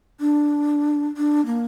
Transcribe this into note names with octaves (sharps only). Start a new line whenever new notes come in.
D4
D4
A#3